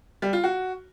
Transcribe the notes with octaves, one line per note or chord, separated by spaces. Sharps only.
G3
F4
F#4